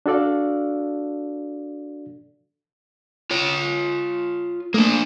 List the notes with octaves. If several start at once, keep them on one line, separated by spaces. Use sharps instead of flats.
D4 F#4 A4 D5 F5
F4 C#5
A3 A#3 D4